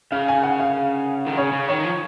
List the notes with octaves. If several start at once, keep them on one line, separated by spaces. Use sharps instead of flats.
C#3 F5
G#5
F#5
F5
D#3
C#3 C#5
C#3
D#3 C#5
F3